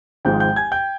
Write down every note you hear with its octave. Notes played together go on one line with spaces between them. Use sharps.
G#1 G#2 F3 G#3 G5 G6
G5 G6
G#5 G#6
G5 G6